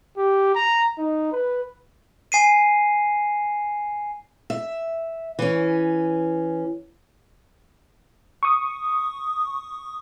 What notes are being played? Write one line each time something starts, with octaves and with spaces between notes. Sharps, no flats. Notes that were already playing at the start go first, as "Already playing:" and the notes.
G4
A#5
D#4
B4
G#5 C7 D#7
E5
E3 C#4
C#6 D#6